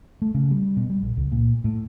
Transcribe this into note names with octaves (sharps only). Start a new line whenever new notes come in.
A3
C#3
G3
B2
G3
A#1
C#2
A#2
A2